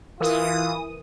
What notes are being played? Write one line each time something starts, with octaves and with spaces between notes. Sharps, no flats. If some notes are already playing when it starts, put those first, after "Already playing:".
E3 F4 A#4 D#6